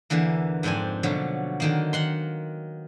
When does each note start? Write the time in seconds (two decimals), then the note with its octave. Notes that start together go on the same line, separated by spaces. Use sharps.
0.10 E2 D3 E3 A#3
0.63 F2 G#2 C4 D4 G#5
1.03 B2 D3 F3 F#3
1.60 D3 D#3 A#3
1.93 D#3 F#5 C6